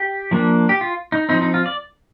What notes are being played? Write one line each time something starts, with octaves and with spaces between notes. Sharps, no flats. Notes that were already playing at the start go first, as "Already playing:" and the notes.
Already playing: G4
F3 A#3 D4
G4
F4
D#4
F3 C4 D#4
D#4
F4
D5